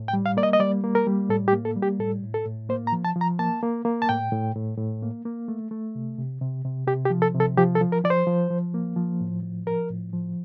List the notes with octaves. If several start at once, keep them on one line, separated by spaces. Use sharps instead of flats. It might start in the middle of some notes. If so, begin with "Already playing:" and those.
Already playing: A2
G5
G3
F5
A#3 D5
D#5
D#5
G3 D5
A#3
A#4
G3
A2 A4
G4
A#3
A4
G3
G4
A2 A4
A2
A4
A2
A#3 C5
A#5
F3
A5
F3
A#5
A#3 A5
A#3
A#3
A5
A2 G5
A2
A2
A2
A#3
A#3
A3
A3
C3
C3
C3
C3
C3 G4
G4
F3
A4
C3
A4
F3 G4
A4
F3
A#4
F3 D5
C5
F3
F3
A#3
F3
A2
F3
F3 A#4
A2
F3